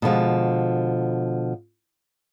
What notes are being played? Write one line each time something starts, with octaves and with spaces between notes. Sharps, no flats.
B2 D3 F3 G#3